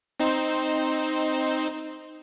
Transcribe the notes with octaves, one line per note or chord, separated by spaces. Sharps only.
C4 D#4 C5